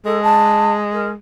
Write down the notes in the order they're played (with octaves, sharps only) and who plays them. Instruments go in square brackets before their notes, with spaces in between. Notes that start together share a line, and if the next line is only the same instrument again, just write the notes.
[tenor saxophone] G#3 [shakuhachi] A4
[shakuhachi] A5
A#4